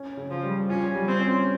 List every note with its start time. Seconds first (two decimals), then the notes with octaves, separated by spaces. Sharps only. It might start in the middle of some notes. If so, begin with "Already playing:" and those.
Already playing: C#4
0.17 C#3
0.31 F3
0.43 G3
0.69 C#4 F4
0.95 G3
1.08 C4
1.21 C#4